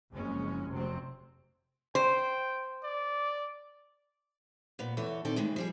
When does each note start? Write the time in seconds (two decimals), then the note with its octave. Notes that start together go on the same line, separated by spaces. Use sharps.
0.12 F#1 F2 C#3 G#3 C#4
0.69 F1 F#2 C3 F#3 C4
1.95 C5 G5
2.83 D5
4.79 A#2 B3
4.97 E2 E3 A4 C#5
5.25 A#2 D#3 C4 A4 D5
5.36 A2 D#3 E3 G#3
5.56 F3 G3 G#4